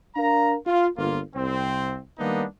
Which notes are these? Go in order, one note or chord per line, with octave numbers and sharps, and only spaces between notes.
D4 A#4 F5 A#5
F4
G1 A#3 F4
C2 C4
D#3 G3 A#3 B3 D4 D#4